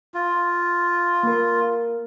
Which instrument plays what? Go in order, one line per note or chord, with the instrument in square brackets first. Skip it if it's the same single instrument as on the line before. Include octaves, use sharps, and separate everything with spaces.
[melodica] F4
[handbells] A#3 A#4